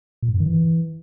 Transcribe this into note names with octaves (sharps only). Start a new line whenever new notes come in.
A#2
G#2
F#2
D#3
E3